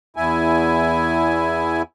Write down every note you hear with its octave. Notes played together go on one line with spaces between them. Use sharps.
E2 E4 G#5